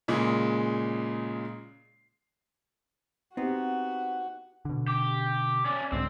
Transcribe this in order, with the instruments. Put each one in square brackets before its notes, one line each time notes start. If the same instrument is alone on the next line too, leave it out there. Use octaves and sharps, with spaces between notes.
[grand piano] A#2 C#3 G#3
[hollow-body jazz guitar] B3 C4 [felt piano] D#4 G4 [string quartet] F#4
[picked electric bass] B2 D3
[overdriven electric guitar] G4
C#4 D5
[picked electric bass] C2 G#2 D3 [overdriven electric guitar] C4